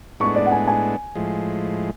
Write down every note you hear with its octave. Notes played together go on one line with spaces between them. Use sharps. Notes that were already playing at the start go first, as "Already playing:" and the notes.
A2 G#3 B3 D4 C#6
D5
F#5
G#5
G#5
A2 F3 G#3